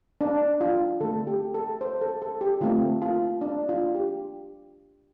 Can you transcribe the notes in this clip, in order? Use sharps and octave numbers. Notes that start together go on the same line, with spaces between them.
D4
F4
D3 A3 C4 A4
G4
A4
C5
A4
A4
G4
D3 A3 C4 F4
F4
D4
F4
G4